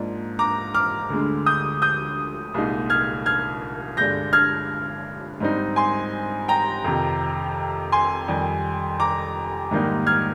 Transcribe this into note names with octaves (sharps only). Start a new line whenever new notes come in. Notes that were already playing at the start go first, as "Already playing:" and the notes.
Already playing: G#2 F3 A#3 D4
A#5 D6
D6 F6
D2 D3 G#3
D#6 G6
D#6 G6
C2 A#2 G#3 D#4
F6 G#6
F6 G#6
G2 D3 G#3 D4 G6 A#6
F6 G#6
G#2 G3 C4 D#4
G#5 C6
G5 A#5
F2 C3 D#3
G#5 C6
F2 D#3 G3
A#5 D6
G#2 D#3 G3 A#3 D#4
F6 G#6